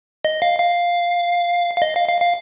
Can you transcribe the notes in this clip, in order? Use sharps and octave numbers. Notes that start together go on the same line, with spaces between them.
D#5
F5
F5
F5
D#5
F5
F5
F5